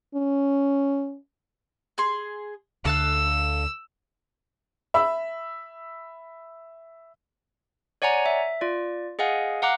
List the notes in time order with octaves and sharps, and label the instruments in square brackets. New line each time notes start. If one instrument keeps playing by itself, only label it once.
[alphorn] C#4
[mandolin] G#4 C6
[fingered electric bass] D2 D3 [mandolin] A4 F5 F#6 [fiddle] E6
[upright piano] E5 B5 E6
[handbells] C#5 D5 F#5 G#5 A#5
E5
F4 D5
G#4 D#5 F5 F#5 G#5
F5 F#5 A#5 D6 F#6